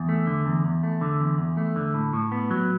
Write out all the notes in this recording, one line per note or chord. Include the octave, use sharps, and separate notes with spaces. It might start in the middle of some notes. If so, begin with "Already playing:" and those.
Already playing: E2
A3
D3
E2
E2
A3
D3
E2
E2
A3
D3
A2
A2
B3
F#3